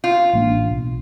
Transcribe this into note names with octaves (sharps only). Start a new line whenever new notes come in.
F4
A1 A#3 D4
B1